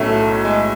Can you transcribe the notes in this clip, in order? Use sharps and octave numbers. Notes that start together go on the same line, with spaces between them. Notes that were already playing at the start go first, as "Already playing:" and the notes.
Already playing: B1 A2 F#3 A3 C#4
G#3